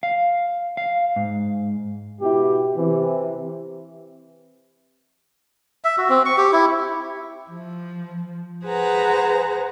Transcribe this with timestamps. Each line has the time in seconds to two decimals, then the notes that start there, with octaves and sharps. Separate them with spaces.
0.03 F5
0.77 F5
1.16 G#2
2.20 B2 E4 G4
2.76 C3 E3
5.84 E5
5.98 F#4
6.09 C4
6.25 C#6
6.38 G4
6.53 E4
7.49 F3
8.64 G#4 B4 C5 F#5 A#5